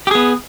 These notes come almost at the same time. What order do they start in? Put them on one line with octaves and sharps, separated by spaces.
G4 G#4 B3